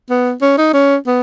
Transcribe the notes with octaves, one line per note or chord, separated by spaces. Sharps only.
B3
C#4
D#4
C#4
B3